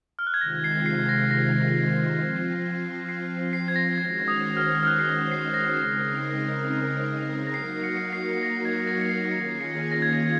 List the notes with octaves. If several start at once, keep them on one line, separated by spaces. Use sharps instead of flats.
F6
F#6
G#6
C3 D#3 G#3 C4 F4 A#6
C7
C7
A#6
A#6
F3 C4 F4
C7
C7
G#6
A#6
D#3 G#3 C#4 F#4 C5 G#6
D#6
F6
F6
F#6
C7
A#6
C7
A#6
C#3 G#3 C4 D#4 A#4
A#6
F#3 A#3 D#4 F#4 A#4 C7
C#7
C#7
C7
A#6
G#6
A#6
C#7
C7
D#3 A#3 C#4 F4 G#4 C#7
C7
A#6
G#6
A#6